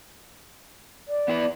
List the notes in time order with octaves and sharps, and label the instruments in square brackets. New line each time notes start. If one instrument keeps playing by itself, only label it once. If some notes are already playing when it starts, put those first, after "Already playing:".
[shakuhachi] D5
[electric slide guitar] B3 E4 B4